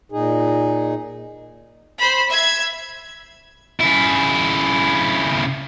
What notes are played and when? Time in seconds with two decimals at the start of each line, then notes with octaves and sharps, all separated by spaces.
0.12 A#2 D#4 G#4
1.98 C5 B5
2.29 E5 G#6
3.81 C#3 E4